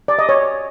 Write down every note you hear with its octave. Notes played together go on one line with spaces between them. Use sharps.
D5
D#5
C#5